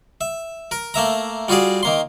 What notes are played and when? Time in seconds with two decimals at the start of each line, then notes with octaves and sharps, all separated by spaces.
0.21 E5
0.71 A#4
0.94 A3 A#3 E5 A#5
1.48 G3 F4 F#4 G#4 D5
1.83 D#3 A#3 C6